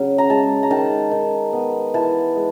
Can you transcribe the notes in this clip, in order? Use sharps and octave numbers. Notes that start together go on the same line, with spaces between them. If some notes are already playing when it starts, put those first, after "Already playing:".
Already playing: C#3 F#3
A#5
G#3 A5
A#5
D#3 A5
D#3
B3
E3 A5
G#3